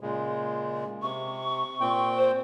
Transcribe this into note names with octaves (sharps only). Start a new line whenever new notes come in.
A#2 C#3 G#3
C3 C#6
A#2 C4 G5
C5